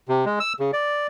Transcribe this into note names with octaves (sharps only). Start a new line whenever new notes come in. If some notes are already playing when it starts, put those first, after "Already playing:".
C3
G#3
E6
C#3
D5